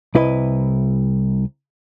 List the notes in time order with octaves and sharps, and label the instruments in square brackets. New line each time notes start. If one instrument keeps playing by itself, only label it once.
[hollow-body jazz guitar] C2 E4 B4 D#5